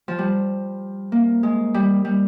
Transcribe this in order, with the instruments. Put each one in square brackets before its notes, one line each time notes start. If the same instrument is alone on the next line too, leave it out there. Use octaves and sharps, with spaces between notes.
[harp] F3
G3
A#3
G#3
G3
G3